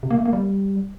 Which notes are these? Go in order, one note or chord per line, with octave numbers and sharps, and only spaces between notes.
C3
A#3
A3
A#3
G3